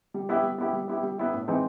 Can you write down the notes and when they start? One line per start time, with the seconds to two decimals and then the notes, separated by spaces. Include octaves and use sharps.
0.14 G3
0.29 B3 E4 G4
0.43 G3
0.58 B3 E4 G4
0.73 G3
0.88 B3 E4 G4
1.03 G3
1.18 B3 E4 G4
1.33 A2
1.48 E3 G#3 C4 D#4